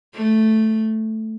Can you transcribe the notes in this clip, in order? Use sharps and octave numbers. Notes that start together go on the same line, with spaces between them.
A3